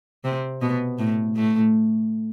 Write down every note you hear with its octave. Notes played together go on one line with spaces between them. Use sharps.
C3 C4
B2 B3
A2 A3
A2 A3